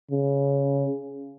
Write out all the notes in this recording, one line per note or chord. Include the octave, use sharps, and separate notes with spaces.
C#3